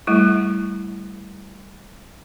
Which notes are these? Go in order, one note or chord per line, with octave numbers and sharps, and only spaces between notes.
G3 A3 E4